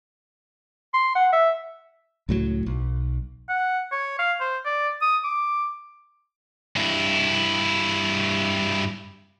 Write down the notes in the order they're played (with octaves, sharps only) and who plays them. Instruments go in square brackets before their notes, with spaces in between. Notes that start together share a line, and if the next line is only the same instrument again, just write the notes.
[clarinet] C6
F#5
E5
[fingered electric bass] C#2 A2 F#3
B1
[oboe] F#5
C#5
F5
C5
D5
D#6
D6
[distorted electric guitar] G2 E4